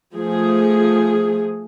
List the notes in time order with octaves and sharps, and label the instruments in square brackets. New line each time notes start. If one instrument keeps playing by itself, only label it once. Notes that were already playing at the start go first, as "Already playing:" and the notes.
[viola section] F3 A3 G#4